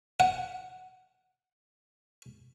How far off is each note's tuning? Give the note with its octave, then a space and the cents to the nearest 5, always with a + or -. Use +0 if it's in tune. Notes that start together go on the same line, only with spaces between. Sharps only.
F#5 +5